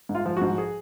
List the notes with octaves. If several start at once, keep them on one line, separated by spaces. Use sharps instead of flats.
G#2
F4
F3
G#2 F#4
G#4